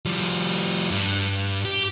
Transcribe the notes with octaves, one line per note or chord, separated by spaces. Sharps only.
F3 G3
G2
G4